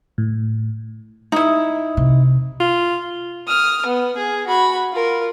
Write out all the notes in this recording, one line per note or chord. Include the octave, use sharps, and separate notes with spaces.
A2
D#4 E4
C3
F4
D#6 F6
B3
G#4
F#4 B5
F4 A#4